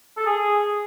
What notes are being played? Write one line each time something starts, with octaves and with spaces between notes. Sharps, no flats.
A4
G#4